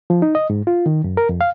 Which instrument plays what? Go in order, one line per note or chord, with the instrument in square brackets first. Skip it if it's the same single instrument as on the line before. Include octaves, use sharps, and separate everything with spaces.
[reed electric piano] F3
D#4
D#5
G#2
F4
D#3
F#2
A#4
F2
F5